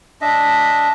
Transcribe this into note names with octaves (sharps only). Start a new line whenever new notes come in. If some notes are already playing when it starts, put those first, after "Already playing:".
D4 D#5 E5